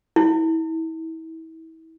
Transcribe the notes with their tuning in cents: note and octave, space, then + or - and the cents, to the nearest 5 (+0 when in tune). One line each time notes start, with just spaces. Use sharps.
E4 -35